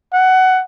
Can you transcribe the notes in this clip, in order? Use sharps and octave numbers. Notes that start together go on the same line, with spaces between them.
F#5